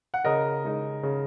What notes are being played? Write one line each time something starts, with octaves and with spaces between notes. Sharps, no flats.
F#5
C#3 A#4 D#5
G#3 D#4
C#3